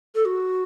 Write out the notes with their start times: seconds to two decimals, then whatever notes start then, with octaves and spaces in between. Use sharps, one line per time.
0.15 A4
0.25 F#4